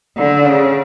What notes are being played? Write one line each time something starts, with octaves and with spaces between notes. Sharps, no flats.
D3
C#3